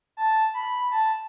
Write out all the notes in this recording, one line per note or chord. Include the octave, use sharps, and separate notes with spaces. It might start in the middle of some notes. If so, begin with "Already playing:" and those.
A5
B5
A5